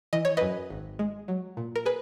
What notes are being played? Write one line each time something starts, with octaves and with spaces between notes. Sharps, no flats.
E3 D#5
C#5
F#2 B4 D#5
G#1
G#3
F#3
A#2
A#4
G#4 B4